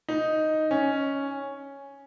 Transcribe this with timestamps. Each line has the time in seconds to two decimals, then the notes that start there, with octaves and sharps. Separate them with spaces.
0.08 D#4
0.71 C#4